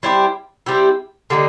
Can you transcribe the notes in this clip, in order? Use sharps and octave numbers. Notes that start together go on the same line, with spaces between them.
G3 C4 E4 G4
G3 C4 E4 G4
D3 G3 A#3 D#4